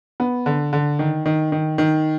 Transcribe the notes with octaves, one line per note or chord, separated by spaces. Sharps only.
B3
D3
D3
D#3
D#3
D#3
D#3